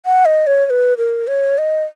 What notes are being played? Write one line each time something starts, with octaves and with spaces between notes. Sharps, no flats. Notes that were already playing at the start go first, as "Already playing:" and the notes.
F#5
D#5
C#5
C#5
B4
A#4
C#5
D#5